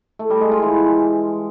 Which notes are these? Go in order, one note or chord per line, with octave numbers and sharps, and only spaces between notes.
A3
G3
G#3
F4
E3